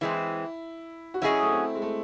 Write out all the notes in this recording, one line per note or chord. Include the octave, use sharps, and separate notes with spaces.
E3 G#3 C4 E4
F#4
F#3 C#4 E4 G#4 D#5
A3
C4
G#3
A3